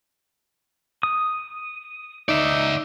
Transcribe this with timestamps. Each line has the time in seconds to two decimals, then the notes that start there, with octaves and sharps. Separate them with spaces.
1.03 D#6
2.29 D#4 D5 E5